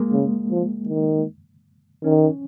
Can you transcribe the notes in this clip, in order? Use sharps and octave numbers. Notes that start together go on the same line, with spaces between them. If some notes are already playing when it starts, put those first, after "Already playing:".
Already playing: G#3 A#3
C#3
F3
D#3
D#3 C#4